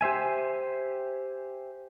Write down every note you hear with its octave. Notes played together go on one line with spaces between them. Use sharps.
G4 C5 E5 G#5